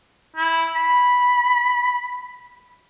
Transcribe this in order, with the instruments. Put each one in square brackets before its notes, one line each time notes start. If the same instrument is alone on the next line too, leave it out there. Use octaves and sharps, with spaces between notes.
[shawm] E4
B5